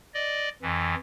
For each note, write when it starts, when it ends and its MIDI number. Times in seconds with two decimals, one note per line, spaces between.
0.14 0.49 74
0.14 0.49 75
0.62 0.95 41
0.62 0.95 52